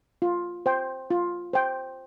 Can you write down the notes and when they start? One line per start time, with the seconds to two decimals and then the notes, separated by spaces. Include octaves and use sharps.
0.22 F4
0.66 C5 G5
1.10 F4
1.53 C5 G5